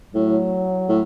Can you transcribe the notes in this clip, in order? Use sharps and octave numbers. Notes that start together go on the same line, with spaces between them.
A2 F#3
A2